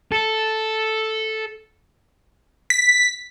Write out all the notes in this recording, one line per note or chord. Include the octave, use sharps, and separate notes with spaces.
A4
B6